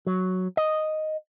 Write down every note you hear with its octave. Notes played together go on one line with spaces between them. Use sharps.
F#3
D#5